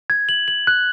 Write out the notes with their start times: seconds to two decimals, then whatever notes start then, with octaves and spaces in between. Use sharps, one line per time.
0.10 G#6
0.29 F#7
0.48 F#7
0.67 F#6